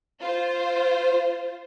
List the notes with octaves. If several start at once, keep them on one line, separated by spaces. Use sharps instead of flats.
F4 C5